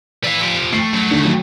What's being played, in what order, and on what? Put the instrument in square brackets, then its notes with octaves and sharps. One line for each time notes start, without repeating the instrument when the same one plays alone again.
[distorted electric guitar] B4 E5 [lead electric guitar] D5 F5
[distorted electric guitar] F3 G4
[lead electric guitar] A3 [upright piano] C7
[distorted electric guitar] F#2 F#3
[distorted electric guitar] D#2 [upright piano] D3
[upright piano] F#3